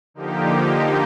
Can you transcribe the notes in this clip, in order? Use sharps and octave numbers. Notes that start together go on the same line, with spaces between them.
D3 F3 A#3 D#4 G4